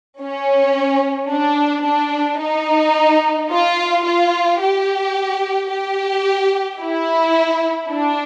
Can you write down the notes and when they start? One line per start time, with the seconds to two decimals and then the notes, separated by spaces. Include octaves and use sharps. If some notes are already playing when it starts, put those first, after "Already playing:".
0.21 C#4
1.31 D4
1.86 D4
2.41 D#4
3.51 F4
4.06 F4
4.62 G4
5.70 G4
6.81 E4
7.91 D4